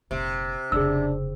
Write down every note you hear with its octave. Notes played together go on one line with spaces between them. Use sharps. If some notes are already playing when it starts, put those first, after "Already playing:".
F1 A#1 C3
F1 C#3 D4 G#4 E6